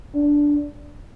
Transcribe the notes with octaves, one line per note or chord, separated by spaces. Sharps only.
D4